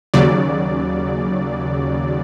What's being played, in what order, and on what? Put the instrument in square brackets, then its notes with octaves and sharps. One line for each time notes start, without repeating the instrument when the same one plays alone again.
[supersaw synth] D#2 C#3 F#3 D5